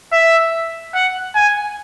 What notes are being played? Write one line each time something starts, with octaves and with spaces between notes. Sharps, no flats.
E5
F#5
G#5